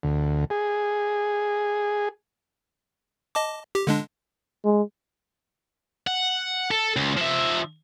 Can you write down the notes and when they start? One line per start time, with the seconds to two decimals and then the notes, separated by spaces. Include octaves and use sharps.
0.03 D2
0.50 G#4
3.35 D#5 A5 D6
3.75 G4
3.87 D3 G#3 D4
4.65 G#3
6.07 F#5
6.71 A4
6.96 C#2
7.17 F3 E5